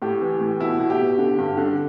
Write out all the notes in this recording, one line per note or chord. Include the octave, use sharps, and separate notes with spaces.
A2 G4
E3
A2
B2 E4
B2
G4
B2
D3
G2
D3